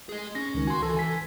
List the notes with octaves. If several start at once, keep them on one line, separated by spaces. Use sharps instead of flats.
G#4 D#5
C#4 A#6
C#2 D#3
F#4 G#5 C6
E3 A4
G#5 B6